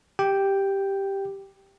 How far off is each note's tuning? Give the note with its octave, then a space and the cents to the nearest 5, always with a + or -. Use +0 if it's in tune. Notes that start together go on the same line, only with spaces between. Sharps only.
G4 +0 G5 +0